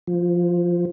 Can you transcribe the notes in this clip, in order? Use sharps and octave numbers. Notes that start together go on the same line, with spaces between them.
F3